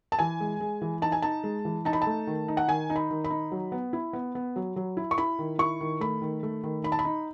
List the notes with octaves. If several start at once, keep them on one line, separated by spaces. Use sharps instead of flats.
A5
E3 G#5
G#3
G#3
E3
D#4 A5
G#5
D#4 A5
G#3
E3
D#4 A5
B5
A5
A3
D#3
D#4
F#5
D#3 G#5
D#4
B5
D#3
B5
D#4
F#3
B3
E4
B3
B3
F#3
F#3
E4
C#6
E4 B5
D#3
E4 C#6
D#3
A3 B5
D#3
A3
D#3
D#4 B5
A5
B5
D#4